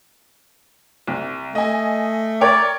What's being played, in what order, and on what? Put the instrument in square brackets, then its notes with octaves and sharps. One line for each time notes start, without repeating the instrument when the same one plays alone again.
[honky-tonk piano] C2
[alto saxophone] A3 [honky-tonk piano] D#5 G#5
[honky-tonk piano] A#4 C#5 G5 [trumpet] D5